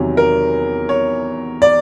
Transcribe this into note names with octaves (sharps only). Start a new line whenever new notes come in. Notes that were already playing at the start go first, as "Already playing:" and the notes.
Already playing: E2 C3 D#3 F#3
A#4
C#5
D5